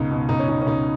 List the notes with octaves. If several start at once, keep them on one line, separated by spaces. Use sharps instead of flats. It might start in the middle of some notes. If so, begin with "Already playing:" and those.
Already playing: C#2 B2 D#4
B2
C#2 D#4
C#4
B2 D#4
C#4
C#2 D#4